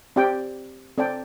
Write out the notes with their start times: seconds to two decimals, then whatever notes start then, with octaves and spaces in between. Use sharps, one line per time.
0.16 C4 G4 D5 G5
0.98 C4 A4 D5 G5